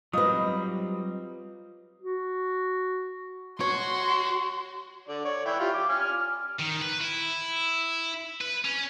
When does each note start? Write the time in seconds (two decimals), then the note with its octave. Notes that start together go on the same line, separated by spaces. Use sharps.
0.13 F#3 G3 C4 D#4 F4 B4 D#5 D#6
2.02 F#4
3.60 F#4 C#5 C6
5.08 D3 D5
5.25 C#5 D5
5.46 E3 E4 G5
5.59 F4 G4
5.74 D6
5.89 G#5 F6
6.60 D#3
6.82 B4
7.01 E4
8.41 B4
8.65 C#4